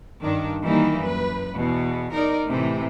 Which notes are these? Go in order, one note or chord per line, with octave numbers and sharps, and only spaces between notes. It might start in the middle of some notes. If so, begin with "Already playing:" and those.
G2 D#3 D4
D#3 E3 G3 A#3 D#4
F#2 B4
E2 B2
D#4 A#4 D5
A2 C3 E3